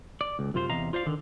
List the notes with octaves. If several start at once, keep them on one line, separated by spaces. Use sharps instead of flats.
D5
C#2
F#2 C3 F4 C5 F5
E2 C3 D#5 F5 A#5
F4 C5 D5 F5
D3 D#3